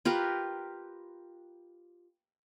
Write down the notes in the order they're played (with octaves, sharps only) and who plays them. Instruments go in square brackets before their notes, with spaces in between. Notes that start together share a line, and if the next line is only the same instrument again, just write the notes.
[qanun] F4 G4 A#4 B4